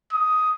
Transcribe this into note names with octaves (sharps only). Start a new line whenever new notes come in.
D#6